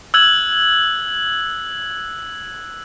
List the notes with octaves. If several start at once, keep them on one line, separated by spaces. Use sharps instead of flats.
E6 F#6 G#6 F#7